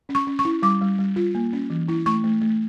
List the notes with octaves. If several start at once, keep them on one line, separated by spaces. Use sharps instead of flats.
C#4
C#6
C#4
C#6
E4
G3 D6
G3
G3
F4
A#3
C#4
E3
E4
A3 C#6
A3
A3